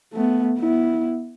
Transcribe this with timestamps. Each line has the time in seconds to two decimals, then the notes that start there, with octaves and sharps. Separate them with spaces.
0.13 A3 B3
0.59 B3 E4